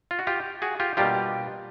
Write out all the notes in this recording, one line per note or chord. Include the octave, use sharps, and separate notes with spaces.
F4
F#4
F4 G4
F#4 G#4
F4 G4
B2 G3 A#3 D4 F4 G4